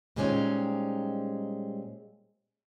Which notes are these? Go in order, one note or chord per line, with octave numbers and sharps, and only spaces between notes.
A#2 G3 G#3 C4 C#4 D#4